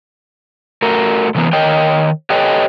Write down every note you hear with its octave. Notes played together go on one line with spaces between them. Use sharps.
A3 F#4 A#4
C3 E3 A#3 B3
D#3 A#4 C#5 D#5 G5
G4 A4 B4 C#5 D#5 G5